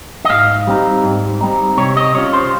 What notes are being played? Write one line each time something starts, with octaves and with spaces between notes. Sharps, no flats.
D#5
G#2 F5
G3 C4 D#4
G#2
G3 C4 D#4
C3 C#5
D#5
G3 C#4 F4 C#5
C5